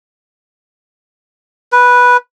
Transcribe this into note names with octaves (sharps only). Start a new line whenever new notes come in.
B4